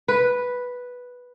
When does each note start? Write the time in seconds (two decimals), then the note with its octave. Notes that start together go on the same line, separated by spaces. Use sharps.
0.08 B4